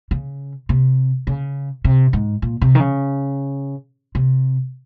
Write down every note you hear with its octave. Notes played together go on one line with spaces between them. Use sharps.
C#3
C3
C#3
C3
G#2
A#2
C3
D#3
C#3
C3